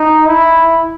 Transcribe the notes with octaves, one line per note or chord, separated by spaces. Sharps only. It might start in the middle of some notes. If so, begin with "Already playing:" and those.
Already playing: D#4
E4